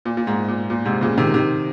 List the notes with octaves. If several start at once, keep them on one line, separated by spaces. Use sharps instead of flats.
A#2
A#2
G#2
A#2
A#2
G#2 C3
A#2 C#3
C3 D#3
C3 D#3